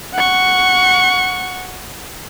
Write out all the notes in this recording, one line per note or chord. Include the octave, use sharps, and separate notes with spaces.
F#5 C#6